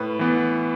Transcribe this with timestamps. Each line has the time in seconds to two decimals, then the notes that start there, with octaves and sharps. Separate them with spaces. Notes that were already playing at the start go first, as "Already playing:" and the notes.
Already playing: A2 B4
0.19 E3 B3